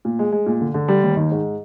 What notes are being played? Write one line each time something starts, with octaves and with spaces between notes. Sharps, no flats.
A#2
G#3
G#3
A#2
D3
D3
G3
D#2
D#3
G#2